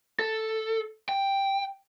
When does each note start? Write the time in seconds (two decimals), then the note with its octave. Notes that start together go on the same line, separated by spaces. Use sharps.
0.19 A4
1.09 G5